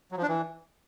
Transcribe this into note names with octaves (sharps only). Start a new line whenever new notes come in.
F#3
F3
D4
E3